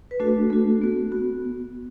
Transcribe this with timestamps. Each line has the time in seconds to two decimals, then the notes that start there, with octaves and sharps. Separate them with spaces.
0.11 B4
0.20 A3 D4 F#4 A4
0.50 A3 D4 F#4
0.82 B3 F#4
1.12 B3 F#4